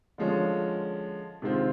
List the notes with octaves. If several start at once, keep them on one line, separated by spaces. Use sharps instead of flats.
D3 F3 G#3 C#4
C3 D#3 G#3 C4 F4